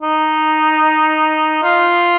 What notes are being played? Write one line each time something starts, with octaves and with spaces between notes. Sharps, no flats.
D#4
F4